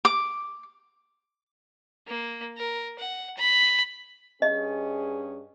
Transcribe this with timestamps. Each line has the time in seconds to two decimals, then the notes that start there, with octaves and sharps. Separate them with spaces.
0.05 D6
2.07 A#3
2.57 A#4
2.99 F#5
3.37 B5
4.42 G2 C#4 G#4 D#5